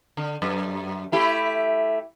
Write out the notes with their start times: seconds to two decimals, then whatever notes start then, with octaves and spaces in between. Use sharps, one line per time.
0.17 D3
0.42 F#2
1.12 A3 E4 G4